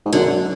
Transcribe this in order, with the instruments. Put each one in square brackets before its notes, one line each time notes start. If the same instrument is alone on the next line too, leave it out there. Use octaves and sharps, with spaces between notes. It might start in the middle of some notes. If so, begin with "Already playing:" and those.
[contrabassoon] G#2
[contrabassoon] F#2 [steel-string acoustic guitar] D3